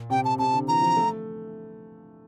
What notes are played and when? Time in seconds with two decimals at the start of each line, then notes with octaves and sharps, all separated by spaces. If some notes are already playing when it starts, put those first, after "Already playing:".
Already playing: A#2
0.10 C3 G5
0.24 A5
0.38 C3 A5
0.53 D3
0.68 E3 A#5
0.82 F3
0.97 A3